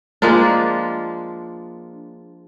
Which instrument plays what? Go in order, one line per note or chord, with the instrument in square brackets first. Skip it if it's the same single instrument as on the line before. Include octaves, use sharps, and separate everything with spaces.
[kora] F3 G#3 A#3 D4